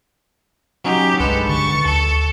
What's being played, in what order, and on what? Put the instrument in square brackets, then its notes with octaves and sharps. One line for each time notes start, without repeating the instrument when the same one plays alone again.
[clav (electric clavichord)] F#3 C#4 D#4 [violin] G4
[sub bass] C2 [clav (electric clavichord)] G2 G#3 B4 [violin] A4
[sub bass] D3 [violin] C#6 A6
[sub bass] D2 [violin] A4 [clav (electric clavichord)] A5